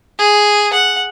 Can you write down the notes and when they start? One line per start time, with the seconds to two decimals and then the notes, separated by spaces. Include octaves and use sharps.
0.19 G#4
0.73 F#5